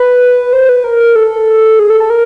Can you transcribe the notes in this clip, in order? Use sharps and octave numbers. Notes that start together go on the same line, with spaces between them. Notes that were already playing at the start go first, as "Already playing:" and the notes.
Already playing: B4
C5
B4
A#4
A4
G#4
A4
A4
A#4